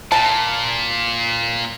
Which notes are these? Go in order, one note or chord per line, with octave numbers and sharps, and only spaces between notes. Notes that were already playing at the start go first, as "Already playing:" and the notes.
A#2 A5